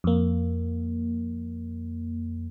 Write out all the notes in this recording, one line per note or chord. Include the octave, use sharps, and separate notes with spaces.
F2 A#3